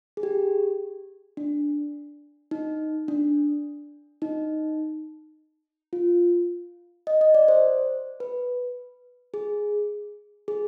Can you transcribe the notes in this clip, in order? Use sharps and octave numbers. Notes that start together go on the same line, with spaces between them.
G#4
G4
D4
D#4
D4
D#4
F4
D#5
D#5
D5
C5
B4
G#4
G#4